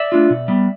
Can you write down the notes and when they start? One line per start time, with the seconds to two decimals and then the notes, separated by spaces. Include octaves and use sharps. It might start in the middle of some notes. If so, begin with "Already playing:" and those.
Already playing: D5 E5
0.12 A3 D4 F4
0.30 B2
0.48 G3 B3